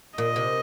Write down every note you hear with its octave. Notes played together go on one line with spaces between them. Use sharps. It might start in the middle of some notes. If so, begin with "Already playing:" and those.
A#2 D#5
C3